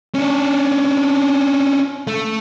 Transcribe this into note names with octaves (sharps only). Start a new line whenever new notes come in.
C#4 D4
A3